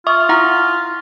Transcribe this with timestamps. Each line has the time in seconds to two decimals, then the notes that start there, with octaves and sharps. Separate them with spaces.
0.07 F4 E5 C#6 D#6
0.29 E4 F#5 A#5